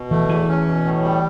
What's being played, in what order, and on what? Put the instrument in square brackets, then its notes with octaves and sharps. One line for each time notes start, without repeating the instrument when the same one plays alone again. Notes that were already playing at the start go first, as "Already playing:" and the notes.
Already playing: [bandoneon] B2
[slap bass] E3 [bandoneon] A3
[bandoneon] E2 [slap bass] E3
[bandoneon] C#4
B2
A2
G3